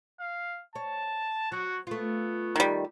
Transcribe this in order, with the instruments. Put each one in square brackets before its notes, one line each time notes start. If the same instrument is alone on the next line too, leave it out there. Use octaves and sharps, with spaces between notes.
[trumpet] F5
[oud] C#5 [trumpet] A5
[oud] F#3 [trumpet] F#4
[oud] A3 F4 [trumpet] B3
[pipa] D#3 G3